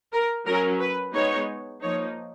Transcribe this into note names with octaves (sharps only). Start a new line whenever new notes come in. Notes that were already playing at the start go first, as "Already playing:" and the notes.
A#4
F#3 C#4 A#4
B4
G#3 B3 D#4 C#5
F3 A#3 D#4 C#5